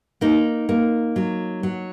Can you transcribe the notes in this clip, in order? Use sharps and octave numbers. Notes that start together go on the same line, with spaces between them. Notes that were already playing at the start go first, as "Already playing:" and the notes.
A#3 D#4
A#3
F#3
F#3